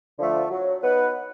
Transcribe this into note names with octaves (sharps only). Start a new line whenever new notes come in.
D3 F3 A3
F#3
B3 D#4 F#4 B4